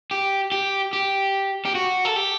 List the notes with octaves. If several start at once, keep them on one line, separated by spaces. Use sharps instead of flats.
G4
G4
G4
G4
F#4
A4
G4